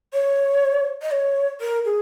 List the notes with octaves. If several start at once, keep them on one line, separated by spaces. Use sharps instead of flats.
C#5
D#5
C#5
A#4
G#4